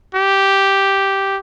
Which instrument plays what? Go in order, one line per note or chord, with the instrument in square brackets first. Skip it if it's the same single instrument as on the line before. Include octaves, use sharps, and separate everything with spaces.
[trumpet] G4